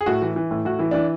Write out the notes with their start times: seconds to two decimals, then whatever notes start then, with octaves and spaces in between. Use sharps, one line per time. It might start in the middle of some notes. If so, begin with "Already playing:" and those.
0.01 G#4
0.06 A2 F#4
0.22 E3
0.36 E3
0.51 A2
0.65 A2 F#4
0.79 E3 E4
0.91 E3 D4